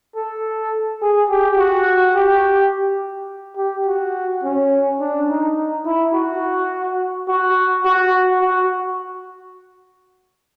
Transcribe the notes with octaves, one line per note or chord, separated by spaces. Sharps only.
A4
G#4
G4
F#4
G4
G4
F#4
C#4
D4
D#4
E4
F#4
F#4
F#4
F#4